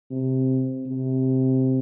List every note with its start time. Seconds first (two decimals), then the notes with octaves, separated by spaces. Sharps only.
0.11 C3
0.86 C3